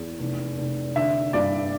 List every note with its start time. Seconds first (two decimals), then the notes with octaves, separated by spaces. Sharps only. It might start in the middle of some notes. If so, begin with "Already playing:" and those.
Already playing: E2
0.19 F1
0.58 F1
0.96 D3 E5
1.33 G2 D5